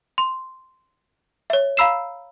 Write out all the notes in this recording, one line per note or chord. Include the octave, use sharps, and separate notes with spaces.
C6
C#5 E5
F5 A#5 B5 E6 C7 E7